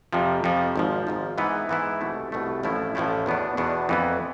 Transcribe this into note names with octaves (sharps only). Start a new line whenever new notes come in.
F2 C3 F3
F2 C3 F3
G#1 G#2 F3
G#1 G#2 F3
G#2 E3 B3 E4
G#2 E3 B3 E4
C2 B2 A3
C2 B2 A3
A1 A2 F3 A3 E4
A1 A2 F3 A3 E4
E2 B2 B3 D4
E2 B2 B3 D4
F2 E3 B3